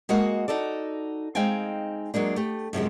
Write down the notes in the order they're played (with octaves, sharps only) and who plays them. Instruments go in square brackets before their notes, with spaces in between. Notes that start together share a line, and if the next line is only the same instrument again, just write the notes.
[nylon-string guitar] G#3 A#3 F#4 D#5 F#5
D#4 F#4 A4 D5
G#3 C4 D#4 F5 G5 G#5
F#3 G#3 A#3 D4
A3 G4
F#2 C3 F3 G#3